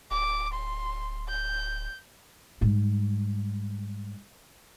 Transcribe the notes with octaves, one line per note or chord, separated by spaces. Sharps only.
D1 D6
C6
G6
G#2 G3